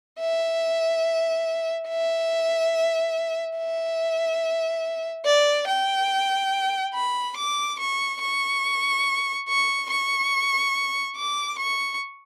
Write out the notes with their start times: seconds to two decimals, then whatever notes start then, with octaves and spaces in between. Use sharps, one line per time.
0.19 E5
1.88 E5
3.58 E5
5.26 D5
5.67 G5
6.94 B5
7.37 D6
7.79 C#6
8.21 C#6
9.49 C#6
9.90 C#6
11.17 D6
11.59 C#6